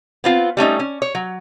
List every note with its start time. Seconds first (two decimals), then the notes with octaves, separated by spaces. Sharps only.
0.24 B3 C4 F4
0.57 G3 A3 C#4 D#4
0.79 C#4
1.02 C#5
1.15 F#3